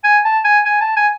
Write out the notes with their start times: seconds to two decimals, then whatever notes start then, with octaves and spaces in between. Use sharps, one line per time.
0.04 G#5
0.25 A5
0.44 G#5
0.65 G#5
0.81 A5
0.96 G#5